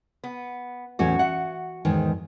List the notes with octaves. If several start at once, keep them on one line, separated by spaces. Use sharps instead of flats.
B3
E2 A2 C#4 F#4
E5 F#5
E2 G#2 D#3